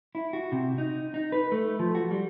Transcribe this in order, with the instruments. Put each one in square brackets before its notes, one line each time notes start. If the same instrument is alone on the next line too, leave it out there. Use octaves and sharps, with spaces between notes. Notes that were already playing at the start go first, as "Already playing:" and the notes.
[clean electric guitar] E4
F#4
C3
D#4
D#4
B4
A3
F3
F#4
G3